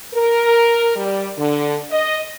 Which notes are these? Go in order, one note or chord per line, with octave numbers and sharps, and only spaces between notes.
A#4
G3
D3
D#5